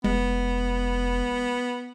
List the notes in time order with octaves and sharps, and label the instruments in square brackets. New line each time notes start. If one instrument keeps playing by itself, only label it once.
[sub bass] F1 [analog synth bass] G#3 [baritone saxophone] B3